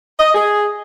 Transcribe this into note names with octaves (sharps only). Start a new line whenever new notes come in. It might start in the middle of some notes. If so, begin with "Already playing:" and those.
D#5
G#4